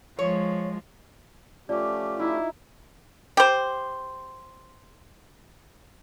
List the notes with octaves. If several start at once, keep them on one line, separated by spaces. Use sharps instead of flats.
F3 G#3 C#5
F3 A3 C#4 G4 D5 D6
D#4 E4
G4 C5